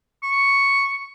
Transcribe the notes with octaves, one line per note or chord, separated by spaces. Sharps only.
C#6